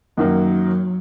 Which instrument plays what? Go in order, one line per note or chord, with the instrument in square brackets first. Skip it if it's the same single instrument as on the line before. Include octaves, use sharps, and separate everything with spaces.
[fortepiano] F#2 D#3 A#3 [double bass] F#3